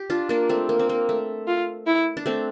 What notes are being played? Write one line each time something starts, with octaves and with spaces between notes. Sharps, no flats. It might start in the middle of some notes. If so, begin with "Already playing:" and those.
Already playing: G4
D4 F4
A#3 D4
A3 C4
A#3
C4
A#3
A3
F4
E4
D4
A3 C4